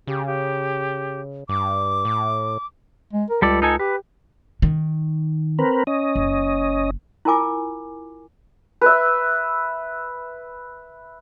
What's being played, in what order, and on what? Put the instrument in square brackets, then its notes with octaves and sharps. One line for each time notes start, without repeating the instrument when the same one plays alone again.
[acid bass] C#3 [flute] G4
[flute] G4
[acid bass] G2 [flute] D6
[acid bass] A2
[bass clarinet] G#3
A#4
[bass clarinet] C#2 [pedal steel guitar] G3 A4 D5
[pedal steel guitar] D#4 A4 G#5
[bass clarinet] G4 [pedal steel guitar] B4
[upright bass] D#3
[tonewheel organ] C4 A#4 B4
C#4 D#5
[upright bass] F#1
[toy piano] E4 F4 A#4 G#5 D6
[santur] B4 E5